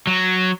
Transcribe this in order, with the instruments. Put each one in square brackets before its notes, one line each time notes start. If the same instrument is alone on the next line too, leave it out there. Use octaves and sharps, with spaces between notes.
[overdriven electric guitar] F#3